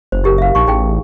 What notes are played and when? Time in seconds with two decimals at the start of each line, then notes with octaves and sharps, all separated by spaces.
0.12 F#1 C5
0.24 E4 G4 A#4
0.38 E5 F5
0.55 A#1 D#4 C#6
0.67 A1 D#4 G#4 G5